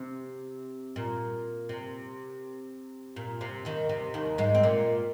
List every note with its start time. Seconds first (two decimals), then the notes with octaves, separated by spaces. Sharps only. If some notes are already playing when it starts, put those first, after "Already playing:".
Already playing: C3
0.96 A#2
1.69 C3
3.16 A#2
3.41 C3
3.65 D#2 D#3
3.89 C3
4.14 D#2 D#3
4.38 G#2 G#3
4.55 C4
4.63 A#2 A#3